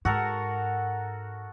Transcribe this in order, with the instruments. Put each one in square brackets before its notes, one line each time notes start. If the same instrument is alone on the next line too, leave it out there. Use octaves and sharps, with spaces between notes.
[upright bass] G#2 [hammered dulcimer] F#4 A4 A#4